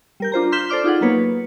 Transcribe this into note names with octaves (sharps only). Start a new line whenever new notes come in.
G3 A#4 G6
D4 F4 C5 A#5
C6 F6 G6 B6 E7 G7
A4 C5 D5 D6 F6
D#4 F4 G#4 F#5
F#3 A#3 B3 B4 C#5